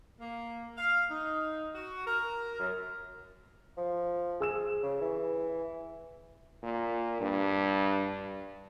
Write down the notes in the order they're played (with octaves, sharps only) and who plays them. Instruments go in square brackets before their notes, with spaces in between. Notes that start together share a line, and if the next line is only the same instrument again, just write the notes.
[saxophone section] A#3
F5
D#4
F#4
A#4
F#2
[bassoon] F3
[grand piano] G#4 E6 E7
[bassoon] C#3
E3
[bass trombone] A#2
G2